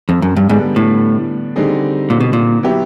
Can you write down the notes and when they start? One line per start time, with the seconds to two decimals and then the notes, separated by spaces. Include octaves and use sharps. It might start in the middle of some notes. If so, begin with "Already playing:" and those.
0.09 F2
0.22 F#2
0.36 G2
0.49 G#2 D3 G3 B3 D4
0.76 A2
1.56 D3 G3 C4 D#4 G#4
2.10 A#2
2.20 B2
2.33 A#2
2.63 F#3 B3 E4 G4